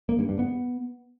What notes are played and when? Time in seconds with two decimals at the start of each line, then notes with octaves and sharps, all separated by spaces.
0.09 A#3
0.19 G2
0.29 G2
0.39 B3